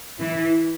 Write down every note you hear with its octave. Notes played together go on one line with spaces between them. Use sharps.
E3 E4